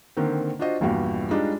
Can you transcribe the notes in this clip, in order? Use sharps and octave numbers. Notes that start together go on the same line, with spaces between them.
D3 D#3 A#3 C4
D4 F4 F#4 C5 D#5
A#1 E2 G2 A#2 F#4 G4
G3 G#3 D4 D#4 F4